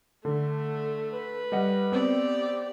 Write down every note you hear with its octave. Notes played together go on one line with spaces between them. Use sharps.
D3 A3
B4
G3 D#5 F#5
B3 C4 G4 D5